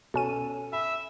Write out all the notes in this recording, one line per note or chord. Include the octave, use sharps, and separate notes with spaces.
B2 C#4 A4 D#7
E5 B5